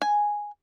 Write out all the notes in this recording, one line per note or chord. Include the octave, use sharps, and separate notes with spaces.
G#5